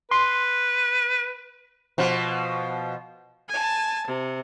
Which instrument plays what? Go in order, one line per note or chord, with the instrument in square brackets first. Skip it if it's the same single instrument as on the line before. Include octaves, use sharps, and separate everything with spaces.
[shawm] B4 [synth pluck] C6
[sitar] B2 F3
[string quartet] G#5 A5
C3